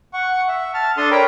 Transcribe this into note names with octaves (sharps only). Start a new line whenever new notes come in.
F#5 C#6
E5
A5 F6
D4 A4 A5 C6 D#6
A#4 C#5 G5 A#5 B5